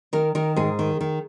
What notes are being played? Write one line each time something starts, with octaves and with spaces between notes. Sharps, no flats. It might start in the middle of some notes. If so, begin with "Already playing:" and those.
D#3 A#4
D#3 A#4
G#2 G#4
D#3
D#3